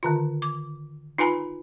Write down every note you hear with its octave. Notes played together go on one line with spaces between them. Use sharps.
D3 D#3 F4
D6
D#4 F4 B4 G#5 A#5 B5